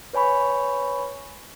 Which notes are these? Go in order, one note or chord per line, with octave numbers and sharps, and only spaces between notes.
B4 C#5 G#5 B5 C#6